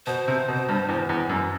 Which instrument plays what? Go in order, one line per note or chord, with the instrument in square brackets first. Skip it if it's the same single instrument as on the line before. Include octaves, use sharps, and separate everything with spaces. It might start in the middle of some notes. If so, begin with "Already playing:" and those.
[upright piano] B2 [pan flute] C5
[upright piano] C3
B2
G2
E2
E2
F#2